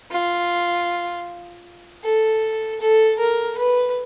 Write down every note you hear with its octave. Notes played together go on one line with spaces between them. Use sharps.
F4
A4
A4
A#4
B4